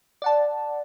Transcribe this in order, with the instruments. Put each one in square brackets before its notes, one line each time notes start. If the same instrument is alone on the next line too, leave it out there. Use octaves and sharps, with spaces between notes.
[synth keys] D5 F#5 A5